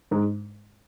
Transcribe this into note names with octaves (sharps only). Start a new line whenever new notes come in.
G#2 G#3